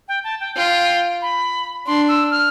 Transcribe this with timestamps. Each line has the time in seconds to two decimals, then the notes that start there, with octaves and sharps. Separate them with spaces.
0.08 G5
0.24 A5
0.40 G5
0.57 F4 G5
1.22 B5
1.87 D4 C6
2.08 E6
2.31 F6